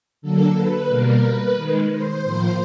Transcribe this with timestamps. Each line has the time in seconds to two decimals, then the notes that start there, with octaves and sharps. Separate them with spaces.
0.22 D3 F#3 A#3 A4
0.55 B4
0.88 B2 G3 A#3 A#4
1.23 B4
1.56 D#3 G#3
1.90 C5
2.24 A2 F3 A#3